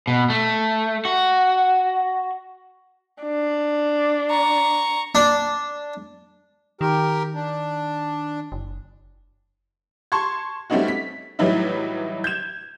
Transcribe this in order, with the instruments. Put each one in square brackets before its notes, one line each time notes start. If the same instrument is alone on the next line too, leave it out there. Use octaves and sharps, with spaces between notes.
[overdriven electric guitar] B2
A3
F#4
[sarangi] D4
[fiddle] A#5 C#6
[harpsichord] D4
[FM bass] D#3 [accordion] G4 A#4
[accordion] D4
[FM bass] F#1
[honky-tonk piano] A5 C6 C#6 G#6
G3 A3 C4 C#4 D#4 F#4
B6
A2 E3 F#3 G3 D#4 E4
G6 G#6 E7